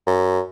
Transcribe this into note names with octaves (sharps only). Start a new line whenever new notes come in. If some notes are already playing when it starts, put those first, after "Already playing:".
F#2